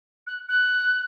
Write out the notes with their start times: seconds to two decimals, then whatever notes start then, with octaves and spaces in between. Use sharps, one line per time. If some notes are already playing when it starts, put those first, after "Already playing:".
0.27 F#6
0.48 F#6